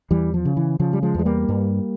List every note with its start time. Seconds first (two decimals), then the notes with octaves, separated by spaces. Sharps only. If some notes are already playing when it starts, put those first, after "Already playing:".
0.11 E2 E3 G3
0.34 F3
0.45 C#3
0.57 E3
0.79 C#3 F3
0.93 G3
1.03 F3 G#3
1.15 E2 G#3
1.25 G3 A#3
1.48 G2